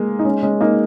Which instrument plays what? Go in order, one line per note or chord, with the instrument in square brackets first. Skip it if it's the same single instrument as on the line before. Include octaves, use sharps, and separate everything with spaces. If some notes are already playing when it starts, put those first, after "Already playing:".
Already playing: [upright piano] G#3 A#3
D#4
G#3 C#4
G#3 C#4
A#3 D#4